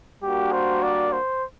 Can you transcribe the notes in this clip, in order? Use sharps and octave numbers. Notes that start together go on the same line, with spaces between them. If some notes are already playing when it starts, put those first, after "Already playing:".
G3 A#3 D4 F#4 G4 A#4
C5
D5
C5